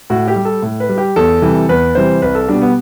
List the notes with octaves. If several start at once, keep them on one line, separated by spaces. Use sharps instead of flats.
A2 F#4
G4
G3
A4
A2
B4
G3
G4
E2 A4
C3 E3 G3
E2 B4
C3 E3 G3 C5
C2 B4
A4
B2 G3 D4
B3